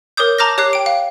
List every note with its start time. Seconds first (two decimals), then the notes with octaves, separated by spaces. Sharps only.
0.17 A#4 C#5 D6 D#6 G6
0.38 A5 A#5 D6 F6 G6 A#6
0.58 G4 C#5 D6 F#6 C7
0.73 G5 D7
0.86 F5